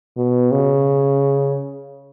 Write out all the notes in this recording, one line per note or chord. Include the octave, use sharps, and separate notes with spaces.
B2
C#3